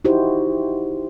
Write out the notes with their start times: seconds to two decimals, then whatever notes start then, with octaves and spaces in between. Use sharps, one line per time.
0.05 D#4 E4 F#4 G4 C5